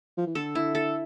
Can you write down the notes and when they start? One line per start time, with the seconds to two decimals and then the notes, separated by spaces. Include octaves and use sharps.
0.17 F3
0.27 E3
0.35 D3 A4
0.55 E4
0.75 A4